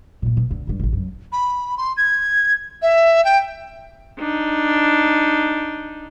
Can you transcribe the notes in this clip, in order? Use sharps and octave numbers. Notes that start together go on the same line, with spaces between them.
A#2 A#3
B2
D2
G1 G2
A1 D#2
F#2
B5
C6
G#6
E5
G5
D4 D#4